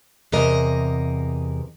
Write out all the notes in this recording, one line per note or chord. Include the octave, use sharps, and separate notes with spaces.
E2 C3 A#4 D#5